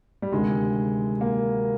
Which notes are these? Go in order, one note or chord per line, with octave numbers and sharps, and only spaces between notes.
G3
D2 C3 D#3 G#3
A#3